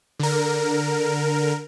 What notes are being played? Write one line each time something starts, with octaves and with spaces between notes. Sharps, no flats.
D3 A#4